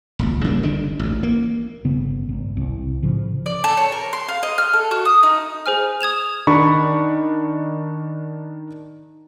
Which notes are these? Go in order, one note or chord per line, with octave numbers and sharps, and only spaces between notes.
D#1 G#1 C#2
C#3 G3 A#3
G1 D3 D#3 D4
A1 D2
A#3
G1 C#3 B3
G#1
C2
A2 C#3 F3
D5
A4
C#5
A#4
C6
F5
D#5
F6
A4
F#4
D#6
D#4
G#4 C5 G#5 F6
D#6 G#6 E7 F7
D#3 D4 D#4 B5 C#6